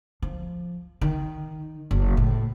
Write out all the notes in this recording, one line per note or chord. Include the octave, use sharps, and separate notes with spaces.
F3
D#3
F#1
A2